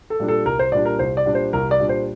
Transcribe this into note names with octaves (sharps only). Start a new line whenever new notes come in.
A4
A#2 G3 D4
A4
C2 A#4
C5
A#2 G3 D4 D5
A#4
C2 C5
D5
A#2 G3 D4
C5
C2 A#4
D5
A#2 G3 D4
C5